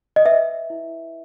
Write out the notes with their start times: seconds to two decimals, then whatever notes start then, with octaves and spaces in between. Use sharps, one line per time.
0.16 D#5
0.25 B4 E5
0.70 E4